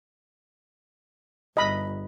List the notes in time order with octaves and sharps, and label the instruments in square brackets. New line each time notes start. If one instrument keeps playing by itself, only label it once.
[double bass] G1 [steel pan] D#5 B5